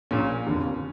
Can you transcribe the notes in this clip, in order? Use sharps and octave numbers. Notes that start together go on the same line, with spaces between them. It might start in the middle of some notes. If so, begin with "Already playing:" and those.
A#1 A#2 C#4
F1 D#2 D3